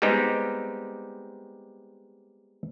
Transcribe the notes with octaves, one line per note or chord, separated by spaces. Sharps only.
G3 G#3 B3 C4 D#4 G4